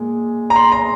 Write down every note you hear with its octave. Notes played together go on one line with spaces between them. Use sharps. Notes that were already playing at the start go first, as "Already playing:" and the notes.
Already playing: A#2 G#3
A#5
C6
A#5